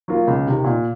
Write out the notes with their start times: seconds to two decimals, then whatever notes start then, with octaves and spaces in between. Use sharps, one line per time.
0.08 F#3 A#3 F4 A#4
0.27 C#2
0.46 C3 D#3
0.64 A#2